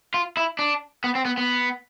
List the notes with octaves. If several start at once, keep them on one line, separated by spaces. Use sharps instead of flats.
F4
E4
D4
B3
C4
B3
B3